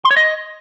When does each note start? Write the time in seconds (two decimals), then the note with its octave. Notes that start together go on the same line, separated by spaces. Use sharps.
0.05 C6
0.11 C#5
0.17 D#5